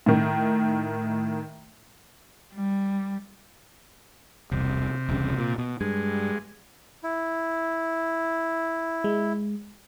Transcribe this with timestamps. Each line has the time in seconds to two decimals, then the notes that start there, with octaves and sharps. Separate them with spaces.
0.06 A2 D#3
2.55 G3
4.52 E1 C2 C3
5.09 E1 C2 C#3
5.38 A#2
5.58 B2
5.81 G2 G#3
7.03 E4
9.04 G#3